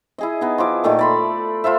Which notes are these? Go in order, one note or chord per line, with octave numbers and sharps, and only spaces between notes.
E4 G#4 D#5
B3 D#4
F3 E4 D6
A#2 D#3 A3 A4
D5 B5 C6
F4 A4 C5 E5